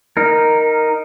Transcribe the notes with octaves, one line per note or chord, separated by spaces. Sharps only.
D#4 A#4